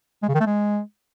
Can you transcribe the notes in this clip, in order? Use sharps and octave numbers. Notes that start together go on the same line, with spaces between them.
G#3
C#3
D#3
A3
G#3